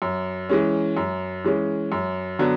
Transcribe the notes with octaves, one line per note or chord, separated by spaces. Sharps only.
F#2
E3 G#3 C#4
F#2
E3 G#3 C#4
F#2
D3 F#3 B3 D4